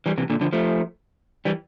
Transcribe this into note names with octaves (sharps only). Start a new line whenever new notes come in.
E3 G3
C3 E3
A#2 D3
D3 F3
F3 A3
E3 G3